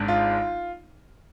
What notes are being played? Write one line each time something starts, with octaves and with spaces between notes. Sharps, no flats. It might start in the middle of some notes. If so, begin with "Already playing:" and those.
Already playing: G#1 G#2 G#3 D4
F4